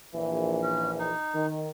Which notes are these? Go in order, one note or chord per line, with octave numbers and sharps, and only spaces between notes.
A#1 E3
C#4
D#4
D#3